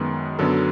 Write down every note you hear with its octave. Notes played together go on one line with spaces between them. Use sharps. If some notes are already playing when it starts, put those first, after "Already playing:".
Already playing: F#2 D#3 G#3 B3
F#2 D3 F#3 B3 A4